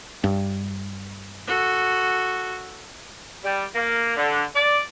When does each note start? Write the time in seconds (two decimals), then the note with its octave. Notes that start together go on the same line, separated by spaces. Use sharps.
0.24 G2
1.47 F#4 A4
3.45 G3
3.75 A#3
4.17 D3
4.55 D5